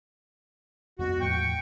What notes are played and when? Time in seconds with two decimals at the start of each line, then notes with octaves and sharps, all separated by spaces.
0.99 F2 G#3 B3 F#4
1.20 E2 A2 F3 G5 C#6